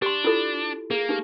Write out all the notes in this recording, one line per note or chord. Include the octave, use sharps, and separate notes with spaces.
D4 G4 C6
E4 F4 A4
A#3 G#4
D#4 G4